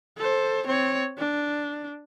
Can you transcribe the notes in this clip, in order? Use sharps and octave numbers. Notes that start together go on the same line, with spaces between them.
A4 C5
C4 C#5
D4